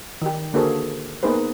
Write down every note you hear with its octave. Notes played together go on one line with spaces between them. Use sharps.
D#3 G4
D3 A#3 F#4 G#4 A4 C5
A#3 B3 D#4 G#4 B4 C5